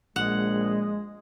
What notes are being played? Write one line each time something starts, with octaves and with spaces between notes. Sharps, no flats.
A#1 G#3 F#5